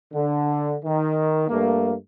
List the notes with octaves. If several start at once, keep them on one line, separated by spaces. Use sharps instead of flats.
D3
D#3
G2 A3 A#3